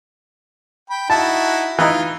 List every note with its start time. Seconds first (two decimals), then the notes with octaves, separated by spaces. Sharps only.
0.90 G5 B5
1.10 D#4 E4 F#4 A5
1.79 E3 D#4 F4